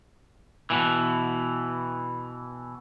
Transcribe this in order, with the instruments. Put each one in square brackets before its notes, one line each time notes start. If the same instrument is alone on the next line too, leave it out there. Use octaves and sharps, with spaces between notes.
[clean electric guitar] B2 E3